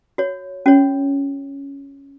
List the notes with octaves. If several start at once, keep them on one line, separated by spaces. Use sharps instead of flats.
F#4 C#5
C#4 F#4 C#5